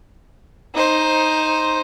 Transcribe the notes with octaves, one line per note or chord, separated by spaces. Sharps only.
D#4 C5